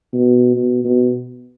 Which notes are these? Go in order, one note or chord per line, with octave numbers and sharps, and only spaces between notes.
B2
B2
B2